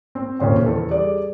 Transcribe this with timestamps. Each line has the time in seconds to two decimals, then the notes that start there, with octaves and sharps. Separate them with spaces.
0.15 C4
0.39 D#1 A#2 C#3 C5 G5
0.65 E2 A4
0.90 G3 G#4 D5